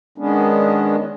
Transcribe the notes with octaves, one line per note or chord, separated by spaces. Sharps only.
D#3 G#3 B3 C#4 D4